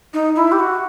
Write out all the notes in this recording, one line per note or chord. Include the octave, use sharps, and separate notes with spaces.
D#4
E4
G4
F#4